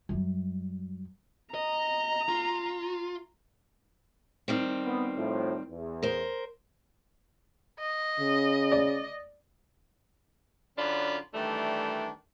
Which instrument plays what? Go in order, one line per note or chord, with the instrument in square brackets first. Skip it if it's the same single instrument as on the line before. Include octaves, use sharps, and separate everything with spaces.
[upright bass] F#2 G3
[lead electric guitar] D#5 [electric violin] A#5
[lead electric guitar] F4
[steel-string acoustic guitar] D#3 G3 C4
[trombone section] B3
A2 F3
E2
[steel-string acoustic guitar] A#4 C5
[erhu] D#5
[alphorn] C#3
[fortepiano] D5
[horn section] F#2 D3 C#4 D4 F4 B5
D#3 E3 G3 A3 D4